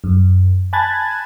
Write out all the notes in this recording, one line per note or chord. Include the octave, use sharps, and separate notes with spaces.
F#2
G#5 A5 B5 F#6 G#6 A6